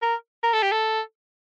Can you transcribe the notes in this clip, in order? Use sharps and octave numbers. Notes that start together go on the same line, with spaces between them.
A#4
A#4
A4
G4
A4